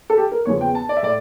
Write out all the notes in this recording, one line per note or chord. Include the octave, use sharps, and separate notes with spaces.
A4
G4
A#4
E2 C#3 F3 C#5
G5
A5
D5
E5
A2 D5